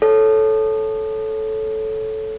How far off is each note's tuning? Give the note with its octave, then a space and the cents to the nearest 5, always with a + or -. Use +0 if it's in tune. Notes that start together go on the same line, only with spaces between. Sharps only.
A4 -10 C#5 +0